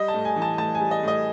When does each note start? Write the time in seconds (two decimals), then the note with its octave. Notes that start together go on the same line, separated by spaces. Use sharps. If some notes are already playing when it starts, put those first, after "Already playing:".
Already playing: G3 D#5
0.08 A5
0.14 A2
0.25 G#5
0.36 E3
0.42 A5
0.58 A2 A5
0.75 G#5
0.80 G3
0.91 D#5
1.03 A2 D#5